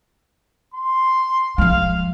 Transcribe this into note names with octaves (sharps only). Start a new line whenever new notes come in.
C6
F3 G#3 F5